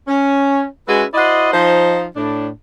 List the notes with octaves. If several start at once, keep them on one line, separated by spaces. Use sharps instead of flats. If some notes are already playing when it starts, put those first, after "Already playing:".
C#4
G#3 C#4 E4 F#4 G#4 B4
E4 F#4 C5 D5 D#5
F3 D#4 C5
A2 D4